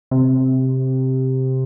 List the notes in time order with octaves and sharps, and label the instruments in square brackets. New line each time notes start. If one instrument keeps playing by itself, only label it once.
[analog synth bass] C3